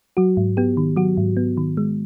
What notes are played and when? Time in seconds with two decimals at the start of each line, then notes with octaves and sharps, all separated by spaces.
0.17 F#3 F#4
0.37 G#2
0.57 B3 G4
0.77 D#3
0.96 F#3 F#4
1.17 G#2
1.37 B3
1.57 D#3
1.77 G#3